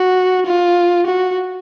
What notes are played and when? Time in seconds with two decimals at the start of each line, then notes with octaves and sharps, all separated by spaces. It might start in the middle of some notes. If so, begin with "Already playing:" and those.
Already playing: F#4
0.46 F4
1.07 F#4